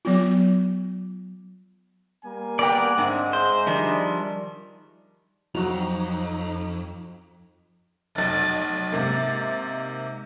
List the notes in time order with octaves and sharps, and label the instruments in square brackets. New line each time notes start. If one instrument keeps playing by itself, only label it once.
[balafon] F#3 B3 F4
[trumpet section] G3 A#3 G#5
[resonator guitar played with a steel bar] B3 A#4 G5 [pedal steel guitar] D5 F#5
[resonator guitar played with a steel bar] G#2 G#3 [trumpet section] C4 D4 E5
[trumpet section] D#4 G#4 E5 [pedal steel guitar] C5
[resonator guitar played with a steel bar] D#3 [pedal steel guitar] F3 G3 D4
[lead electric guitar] F2 [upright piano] F#3 F#4 [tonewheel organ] D#4 A#5
[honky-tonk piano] F1 B1 [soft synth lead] A6
[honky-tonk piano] G#2 C3 A#3